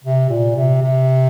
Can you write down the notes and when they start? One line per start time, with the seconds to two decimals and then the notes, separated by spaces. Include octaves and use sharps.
0.04 C3
0.29 A#2
0.55 C3
0.82 C3